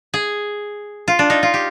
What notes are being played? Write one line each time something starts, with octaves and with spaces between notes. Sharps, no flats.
G#4
F4
D4
D#4
F4
G4